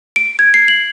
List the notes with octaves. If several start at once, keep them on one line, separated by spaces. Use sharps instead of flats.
D7
G#6
C7
F#7